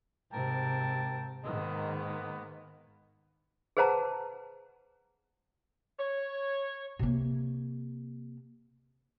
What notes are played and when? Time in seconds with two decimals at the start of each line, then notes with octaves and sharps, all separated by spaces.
0.32 G#2 C3 A#4 G5 A5
1.44 G#2 D#3 G#3 A#3 B3
3.77 G#4 B4 C5 F#5 A5 A#5
5.99 C#5
6.99 C3 A#3